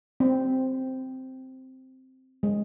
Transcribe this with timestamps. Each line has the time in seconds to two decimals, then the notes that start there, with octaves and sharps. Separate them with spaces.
0.20 C4
2.43 G#3